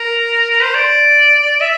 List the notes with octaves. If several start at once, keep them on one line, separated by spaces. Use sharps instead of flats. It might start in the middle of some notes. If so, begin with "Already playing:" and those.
Already playing: A#4
A#4
C5
D5
E5